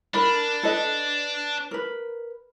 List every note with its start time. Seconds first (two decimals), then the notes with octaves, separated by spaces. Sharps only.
0.14 D4 A#4 B5
0.63 A4 B4 D#5
1.71 A#4 B4